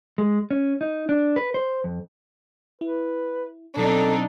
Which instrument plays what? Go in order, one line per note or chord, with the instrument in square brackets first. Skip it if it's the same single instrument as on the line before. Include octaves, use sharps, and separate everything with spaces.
[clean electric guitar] G#3
C#4
D#4
D4
B4
C5
F2
[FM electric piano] E4 [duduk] B4
[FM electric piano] B2 F#3 [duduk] C4 [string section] D4 D#4 [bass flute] A4